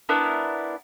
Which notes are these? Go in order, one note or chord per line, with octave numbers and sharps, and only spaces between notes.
B3 D4 E4 A#4